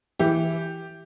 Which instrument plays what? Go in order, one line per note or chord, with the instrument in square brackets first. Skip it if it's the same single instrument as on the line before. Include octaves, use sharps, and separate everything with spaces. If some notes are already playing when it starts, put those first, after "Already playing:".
[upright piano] E3 G4